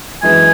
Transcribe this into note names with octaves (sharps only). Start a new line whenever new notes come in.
F#2 E3 G#3 G#5